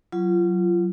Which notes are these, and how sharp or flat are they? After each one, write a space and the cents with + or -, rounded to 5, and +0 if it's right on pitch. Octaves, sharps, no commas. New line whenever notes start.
F#3 +0 F4 -25